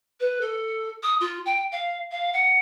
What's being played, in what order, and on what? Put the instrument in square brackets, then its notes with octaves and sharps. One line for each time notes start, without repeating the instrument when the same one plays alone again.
[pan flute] B4
A4
D#6
F4
G5
F5
F5
F#5